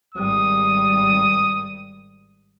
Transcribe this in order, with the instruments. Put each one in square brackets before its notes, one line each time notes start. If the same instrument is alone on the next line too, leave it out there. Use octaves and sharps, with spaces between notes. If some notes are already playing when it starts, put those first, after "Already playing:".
[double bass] G#1 G3 [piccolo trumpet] D#6